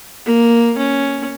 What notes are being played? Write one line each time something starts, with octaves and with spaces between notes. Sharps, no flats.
A#3
C#4